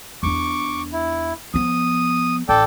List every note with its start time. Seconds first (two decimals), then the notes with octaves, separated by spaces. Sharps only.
0.23 E2 D4 C#6 D6
0.93 E4
1.54 F3 B3 D#6
2.49 A1 A4 D5 G5